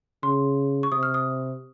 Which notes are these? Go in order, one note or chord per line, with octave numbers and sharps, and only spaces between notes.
C#3 C6
C#6
C3 D#6
F6
D#6